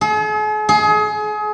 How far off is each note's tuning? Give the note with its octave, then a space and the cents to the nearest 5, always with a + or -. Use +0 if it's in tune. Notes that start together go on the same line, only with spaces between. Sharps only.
G#4 +45
G#4 +30